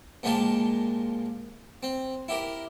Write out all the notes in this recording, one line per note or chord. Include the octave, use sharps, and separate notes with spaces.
A#2 F3 G#3 A#3 G4 A5
C4
E4 G4 A#4